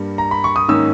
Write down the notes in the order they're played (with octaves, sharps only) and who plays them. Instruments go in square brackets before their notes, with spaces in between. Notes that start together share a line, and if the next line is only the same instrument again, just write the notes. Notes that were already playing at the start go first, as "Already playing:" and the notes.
Already playing: [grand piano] G2 G3 A#3
A#5
B5
C#6
D#6
G#2 D#3 A#3 C#4 E6